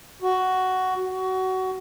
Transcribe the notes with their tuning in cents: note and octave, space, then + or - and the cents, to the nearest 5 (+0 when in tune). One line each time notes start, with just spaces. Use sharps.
F#4 +10
F#4 +20